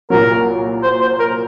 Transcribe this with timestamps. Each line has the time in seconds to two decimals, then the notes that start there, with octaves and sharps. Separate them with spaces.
0.10 C2 A#2 F#3 A#4
0.83 C5
1.01 C5
1.19 A#4